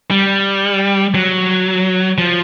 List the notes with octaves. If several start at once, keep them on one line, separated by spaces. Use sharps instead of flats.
G3
F#3
F3